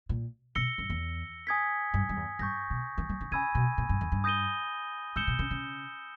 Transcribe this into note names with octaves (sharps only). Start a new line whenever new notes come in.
A#2
B2 E6 A#6 C#7 G7
G2
E2
G#5 D#6 G#6 B6
G2
G2
E2
G2 C#6 G6 A#6
B2
E3
G3
D#3
C#3 G#5 B5 E6 G#6 D#7
B2
A#2
G2
E2
G2
D#6 G6 A#6 D#7 G7
G#2 E6 G6 C#7 E7 G7
B2
C#3
C#3